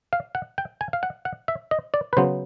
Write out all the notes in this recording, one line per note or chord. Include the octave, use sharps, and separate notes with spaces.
F5
F#5
G5
G#5
F5
F#5
F#5
E5
D#5
D5
B4
C#3 F#3 B3 C5